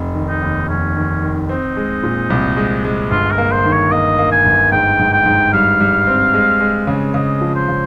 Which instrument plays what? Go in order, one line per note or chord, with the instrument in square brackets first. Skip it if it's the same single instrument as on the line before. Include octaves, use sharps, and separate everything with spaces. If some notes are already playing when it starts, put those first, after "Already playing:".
Already playing: [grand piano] F1
D#3
[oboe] D#4
[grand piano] D#2
[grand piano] F1 [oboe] C#4
[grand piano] D#3
D#3
[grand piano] C4 [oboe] D#4
[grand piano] G#3
A#2
C2
G#3
G#3
[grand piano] G1 [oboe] F4
[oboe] A#4
[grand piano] A#3
[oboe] C5
[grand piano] D#3
[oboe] C#5
[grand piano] A#3 [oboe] D#5
[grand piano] A#3
[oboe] G#5
[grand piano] G1
[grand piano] G#2 [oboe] G5
[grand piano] G#2
[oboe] G5
[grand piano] G#2
[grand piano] G3 [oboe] F5
[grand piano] G3
C4
G#3
G#3
C#3
[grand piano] C#3 [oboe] D#5
[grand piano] F3
[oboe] C5
[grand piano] C#3